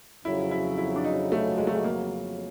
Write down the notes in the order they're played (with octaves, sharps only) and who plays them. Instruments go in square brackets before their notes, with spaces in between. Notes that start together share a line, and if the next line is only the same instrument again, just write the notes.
[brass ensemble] F2 C#3 F#3 [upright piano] E4
[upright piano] E4
E4
D4
D#4
A3
G#3
A3
G#3
A#3